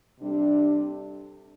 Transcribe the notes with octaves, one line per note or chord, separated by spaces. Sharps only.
C3 G3 D4 A4